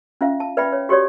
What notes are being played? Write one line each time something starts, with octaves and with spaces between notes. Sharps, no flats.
C#4 F4 E5 F5
A5
B4 D5 E5 G5 B5
C#5
F#4 G4 A4 C#5 D5